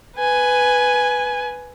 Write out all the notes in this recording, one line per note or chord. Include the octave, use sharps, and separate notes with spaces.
B4 G#5